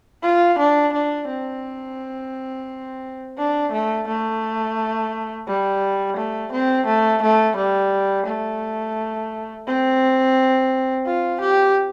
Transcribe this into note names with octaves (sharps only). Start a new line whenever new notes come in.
F4
D4
D4
C4
D4
A3
A3
G3
A3
C4
A3
A3
G3
A3
C4
F4
G4